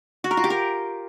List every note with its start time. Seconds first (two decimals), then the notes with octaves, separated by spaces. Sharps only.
0.24 F#4
0.31 A#4
0.37 F4
0.44 G4
0.50 A#4